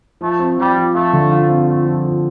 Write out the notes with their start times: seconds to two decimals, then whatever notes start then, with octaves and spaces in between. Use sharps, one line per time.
0.21 F3 A3
0.39 C4
0.58 F3 G3
0.76 F3
0.95 A3 F4
1.13 D3
1.31 F4
1.49 C4
1.67 A3 F4
1.86 F3
2.04 F3